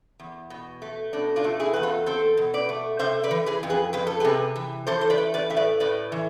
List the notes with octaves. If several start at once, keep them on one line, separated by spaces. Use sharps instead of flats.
E2
B2
A3
B2 D4
D4 F4
A3
E4 G#4
E2 B4
F4 A4
C4 A4 C5
B2
B4 D5
A3
C3 C5 E5
B4 D5
E3
G#4 B4
F2
G#4 B4
F2 B4
A4
C3 G#4 B4
E3
E3 A4 C5
C5
B4 D5
A3
B4 D5
A2 E5
B4 D5
A2 B4 D5
E3